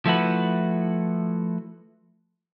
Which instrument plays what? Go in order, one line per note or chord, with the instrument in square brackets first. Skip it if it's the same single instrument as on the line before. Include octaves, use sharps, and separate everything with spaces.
[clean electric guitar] F3 A3 E4 F#4 B4